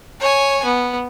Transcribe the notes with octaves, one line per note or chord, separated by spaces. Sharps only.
C#5 G#5
B3